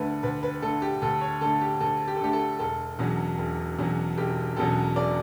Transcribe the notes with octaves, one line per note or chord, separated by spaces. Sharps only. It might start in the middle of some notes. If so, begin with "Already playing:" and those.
Already playing: D2 D3 A3 B4
D2 B4
B4
D3 A3 A4
G4
D2 A4
C#5
D3 A3 A4
G4
D2 A4
G4
A4
D3 A3 G4
A4
E1 A4
E2 B2 F#3 C#4
E1
E2 B2 F#3 C#4
E1 G4
E2 B2 F#3 C#4 A4
E1 D5